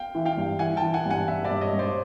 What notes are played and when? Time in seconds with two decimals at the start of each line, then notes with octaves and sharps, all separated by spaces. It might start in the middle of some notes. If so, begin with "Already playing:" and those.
Already playing: F5 G5
0.15 E3
0.25 F5 G5
0.37 G2
0.59 E3 F#5 G#5
0.77 G5 A5
0.82 E3
0.94 F#5 G#5
1.05 G2
1.10 F#5 G#5
1.28 G2 E5 F#5
1.44 D5 E5
1.50 G2
1.61 C#5 D#5
1.73 G2
1.79 C5 D5